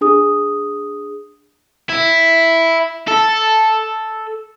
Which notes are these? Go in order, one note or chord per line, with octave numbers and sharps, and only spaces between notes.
D4 G#4 D#6
E4
A4